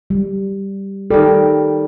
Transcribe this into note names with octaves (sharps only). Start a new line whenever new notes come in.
G3
D#3 G3 A4